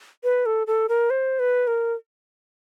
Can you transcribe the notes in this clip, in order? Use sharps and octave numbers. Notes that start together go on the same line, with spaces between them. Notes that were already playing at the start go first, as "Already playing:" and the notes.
B4
A4
A4
A#4
C5
B4
A#4